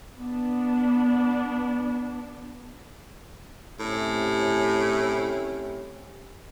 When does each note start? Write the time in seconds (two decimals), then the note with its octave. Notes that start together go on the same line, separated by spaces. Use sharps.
0.19 B3 D4
3.79 A2 C3 C#4 G4